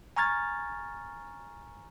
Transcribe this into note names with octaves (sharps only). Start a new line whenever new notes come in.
G#5 A#5 C#6 F6 G#6 A6